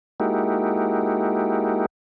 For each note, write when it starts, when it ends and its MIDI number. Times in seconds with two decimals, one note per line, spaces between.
0.20 1.86 56
0.20 1.86 58
0.20 1.86 63
0.20 1.86 64
0.20 1.86 66
0.20 1.86 67